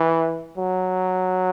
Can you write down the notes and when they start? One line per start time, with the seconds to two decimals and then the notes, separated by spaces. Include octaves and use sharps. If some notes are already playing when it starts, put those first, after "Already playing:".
Already playing: E3
0.58 F#3